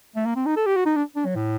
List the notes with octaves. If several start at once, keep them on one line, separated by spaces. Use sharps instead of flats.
A3
A#3
C4
D#4
A4
G4
F#4
D#4
D4
D4
F#3
A2